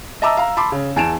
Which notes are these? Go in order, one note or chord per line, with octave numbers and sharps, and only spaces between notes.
D#5 E5 A5 A#5 D6 E6
F5 A#5
A5 B5 C6 D6
C#3
E2 G#5 A5 D7 E7